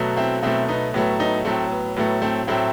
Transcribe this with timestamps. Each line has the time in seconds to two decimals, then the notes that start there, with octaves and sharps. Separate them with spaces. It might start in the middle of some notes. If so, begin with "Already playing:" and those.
Already playing: B2 F#3 A3
0.17 C4 E4
0.42 B2 F#3 A3 C4 E4
0.68 B3 D#4
0.94 A2 F#3 A3 B3
1.19 B3 D#4
1.45 A2 F#3 A3 C4
1.72 B3
1.96 A2 F#3 A3 B3
2.22 A3 C4
2.47 A2 F#3 A3 C4 E4